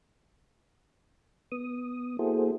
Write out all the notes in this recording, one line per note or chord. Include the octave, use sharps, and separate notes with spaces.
B3 D#6
A#3 E4 F#4 G#4 A4 C5